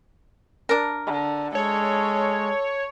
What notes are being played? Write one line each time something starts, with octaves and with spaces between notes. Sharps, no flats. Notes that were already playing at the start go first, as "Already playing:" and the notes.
D4 A#4
D3
G#3 A4 C#5